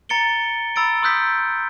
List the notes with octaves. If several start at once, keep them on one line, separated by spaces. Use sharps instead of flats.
A#5 A6 C#7 D7 G7
A#5 B5 E6 A6 D7
C6 D#6 E6 F#6 G6 B6